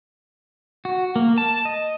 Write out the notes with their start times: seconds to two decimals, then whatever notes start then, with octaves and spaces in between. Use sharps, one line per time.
0.85 F#4
1.16 A#3
1.38 A5
1.65 D#5